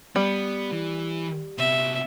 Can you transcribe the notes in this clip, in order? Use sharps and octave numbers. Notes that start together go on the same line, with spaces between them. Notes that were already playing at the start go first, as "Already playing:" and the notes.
G3 B3
E3
C3 B3 E5